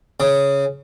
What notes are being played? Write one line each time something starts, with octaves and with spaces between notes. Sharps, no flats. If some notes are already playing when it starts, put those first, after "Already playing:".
C#3